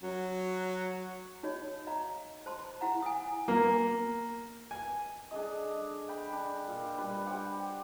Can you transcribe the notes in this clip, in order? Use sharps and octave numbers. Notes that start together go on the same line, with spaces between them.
F#3
D#4 F#4 C#5 D#5
D#5 F5 A#5
C5 A5 C6
E4 F5 F#5 A#5
G#5 D#6
A#3
G#5
D4 G#4 A4 D#5
G5 B5
D4
A#2
G3 D4 B4 G#5
G4 C5 F#5 G5